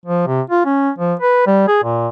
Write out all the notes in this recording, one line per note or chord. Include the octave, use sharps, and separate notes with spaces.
F3
C3
F4
C#4
F3
B4
G3
G#4
A#2